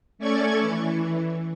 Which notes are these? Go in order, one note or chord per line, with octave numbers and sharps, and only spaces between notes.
A3 C#4 A4 D5 C#6 G#6
E3